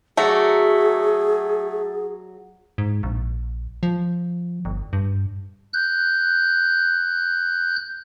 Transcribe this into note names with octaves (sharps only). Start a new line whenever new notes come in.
F#3 A3 F#4 G#4 D5
G#2
A#1
F3
G1
G2
F#6 G6